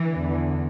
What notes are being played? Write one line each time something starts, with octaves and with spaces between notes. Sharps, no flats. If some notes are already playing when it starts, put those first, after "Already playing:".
Already playing: E3
E2 D3